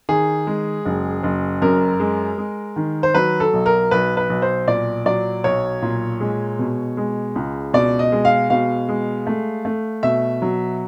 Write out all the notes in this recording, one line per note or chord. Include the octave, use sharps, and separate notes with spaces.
D#3 G#4
G#3
F#1
F#1
F#2 A#4
G#3
G#3
D#3
C5
F#3 B4
A4
B1
A#4
B1 B4
B4
B1
C5
A#2 D5
F#3 D5
B1 C#5
A#2
G#3
B2
G#3
C#2
B2 D5
D#5
G#3
F5
B2 F5
G#3
A3
A3
B2 E5
F#3